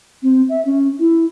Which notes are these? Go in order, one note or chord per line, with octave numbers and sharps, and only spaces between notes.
C4
E5
C#4
E4